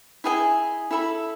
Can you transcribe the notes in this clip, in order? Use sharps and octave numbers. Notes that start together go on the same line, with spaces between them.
E4 G#4 D#5 G#5
E4 A4 E5 B5